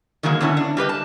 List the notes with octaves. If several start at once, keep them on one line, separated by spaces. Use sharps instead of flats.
D#3 E3 F#3 G#3 A#3
D3 B3 C#4 E4
D4
G3 G4 B4 D#5
A5